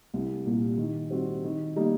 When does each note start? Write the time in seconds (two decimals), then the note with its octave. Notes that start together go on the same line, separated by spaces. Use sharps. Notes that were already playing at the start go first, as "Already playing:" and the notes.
0.14 C2
0.46 A#2 G3 A#3
0.78 D#3
1.11 G3 C4 F#4
1.44 D#3
1.76 G3 A#3 D#4